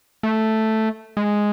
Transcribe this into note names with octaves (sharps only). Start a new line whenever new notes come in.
A3
G#3